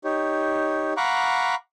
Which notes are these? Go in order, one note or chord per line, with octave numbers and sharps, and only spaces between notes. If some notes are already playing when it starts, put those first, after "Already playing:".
D#4 G4 C#5
F5 F#5 A#5 B5 C#6 D6